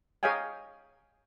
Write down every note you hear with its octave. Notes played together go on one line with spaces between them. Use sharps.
G#4 C#5 D#5 F5 G5 G#5